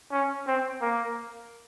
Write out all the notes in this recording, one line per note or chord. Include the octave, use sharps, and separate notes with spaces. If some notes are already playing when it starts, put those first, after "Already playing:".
C#4
C4
A#3